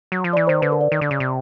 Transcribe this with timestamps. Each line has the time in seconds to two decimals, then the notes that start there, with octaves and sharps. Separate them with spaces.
0.12 F#3
0.24 F3
0.33 E3 D5
0.47 D#3 C5
0.62 D3 B4
0.72 A#4
0.81 D5
0.92 D#3
1.01 D3
1.11 C#3
1.20 C3